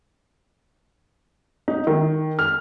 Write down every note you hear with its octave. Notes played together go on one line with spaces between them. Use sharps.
D#4
D#3
F6